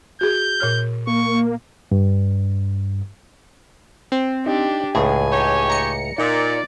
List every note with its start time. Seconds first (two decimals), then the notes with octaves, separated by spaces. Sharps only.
0.21 F#4 G#4 G6
0.60 A#2 C#5 F6
1.07 A#3 C#6
1.91 G2
4.12 C4
4.46 D4 D#4 G4
4.95 C#2 A2 G#4 G#5
5.31 D#4 G4 C#5
5.70 A#5 C#7
6.18 A#2 D#4 D5